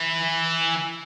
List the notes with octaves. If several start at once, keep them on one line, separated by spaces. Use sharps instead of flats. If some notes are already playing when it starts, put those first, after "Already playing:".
Already playing: E3